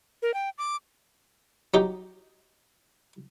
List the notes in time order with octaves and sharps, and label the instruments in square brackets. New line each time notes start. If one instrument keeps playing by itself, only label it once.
[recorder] A#4
G5
D6
[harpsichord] F#3 D#4 G4